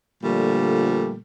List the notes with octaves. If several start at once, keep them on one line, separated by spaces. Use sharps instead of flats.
A#2 D3 F3 G3 A3